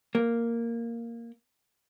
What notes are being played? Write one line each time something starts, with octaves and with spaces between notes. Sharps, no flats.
A#3